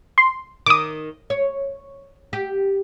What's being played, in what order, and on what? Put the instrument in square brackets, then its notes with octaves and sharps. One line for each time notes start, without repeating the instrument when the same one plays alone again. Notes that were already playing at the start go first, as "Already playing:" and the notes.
[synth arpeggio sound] C6
[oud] D#3 [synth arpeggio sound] D6 D#6
[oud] C#5
G4